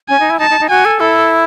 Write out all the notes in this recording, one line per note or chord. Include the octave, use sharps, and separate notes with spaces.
C#4 G#5
D#4
E4
D#4 A5
D#4
D#4
F#4 G#5
A4
E4 A4